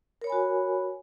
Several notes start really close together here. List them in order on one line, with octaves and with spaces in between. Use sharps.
A#4 C#5 B5 G#5 F#4